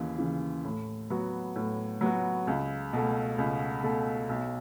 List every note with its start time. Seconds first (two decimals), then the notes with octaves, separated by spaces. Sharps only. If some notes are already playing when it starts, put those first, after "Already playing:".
Already playing: D#2 C#3 E3
0.18 C#3 E3
0.64 A2
1.10 F#3 B3 F#4
1.56 A2
2.01 F#3 B3 F#4
2.47 C#2
2.93 B2 A3
3.38 C#2
3.83 B2 A3
4.29 B1